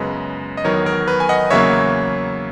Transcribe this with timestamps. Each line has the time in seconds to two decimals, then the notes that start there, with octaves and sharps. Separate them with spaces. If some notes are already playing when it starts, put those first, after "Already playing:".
Already playing: F#2 C#3 G#3 B3 B4 D#5
0.57 D#5
0.64 E2 D#3 F#3 B3 A#4 C#5
0.86 A#4
1.08 B4
1.20 G#5
1.29 D#5 F#5
1.50 E2 C#3 F#3 A#3 C#5 E5